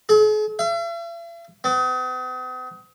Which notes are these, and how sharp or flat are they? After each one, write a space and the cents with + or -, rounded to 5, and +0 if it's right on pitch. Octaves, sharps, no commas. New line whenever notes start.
G#4 +45
E5 +45
B3 +45